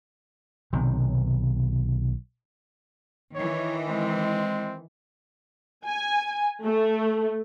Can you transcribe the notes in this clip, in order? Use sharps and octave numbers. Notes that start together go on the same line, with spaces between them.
B1 C3 D#3
D#3 E3 C#5
G#3 C4
G#5
A3